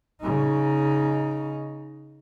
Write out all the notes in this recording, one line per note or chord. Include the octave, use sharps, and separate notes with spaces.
C#3 D#4